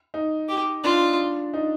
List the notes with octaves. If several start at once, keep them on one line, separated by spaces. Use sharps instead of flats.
D#4
G4
D4 F4
D#4